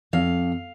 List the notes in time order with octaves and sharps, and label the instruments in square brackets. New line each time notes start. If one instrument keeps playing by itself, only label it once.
[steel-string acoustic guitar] F2 F5